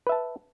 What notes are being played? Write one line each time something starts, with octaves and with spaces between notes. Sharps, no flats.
B4 E5 A5